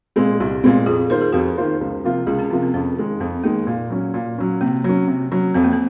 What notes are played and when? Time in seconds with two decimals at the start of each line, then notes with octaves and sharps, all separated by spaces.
0.16 A#2 G#3 C4
0.40 C2
0.64 A#2 G#3 C4
0.86 F2 F4 G#4
1.10 D#3 A#3 F4 A#4 C5
1.21 G#4
1.32 F2 F#4 A#4
1.57 D#3 A#3 F4 C5
1.81 C#2
2.04 C3 F3 A#3 F4
2.27 C#2 F4 G#4
2.38 C#4 F4
2.50 C3 F3 A#3 C#4 F4
2.63 C4
2.74 F2 C#4
2.97 D#3 G#3 D#4
3.20 F2 C4
3.43 D#3 G#3 A#3 D#4
3.67 A#2
3.90 F#3 C#4
4.14 A#2
4.38 F#3 C#4
4.61 C3 A#3
4.84 F#3 C#4
5.07 C3
5.32 F#3 C#4
5.54 F2 C4
5.64 A#3
5.73 C4